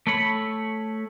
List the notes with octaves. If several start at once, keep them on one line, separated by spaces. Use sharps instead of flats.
A3 A4 C#5 B5